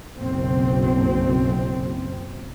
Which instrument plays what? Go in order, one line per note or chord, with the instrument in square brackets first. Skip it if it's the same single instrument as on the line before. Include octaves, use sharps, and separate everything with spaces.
[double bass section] F#1 B1 C4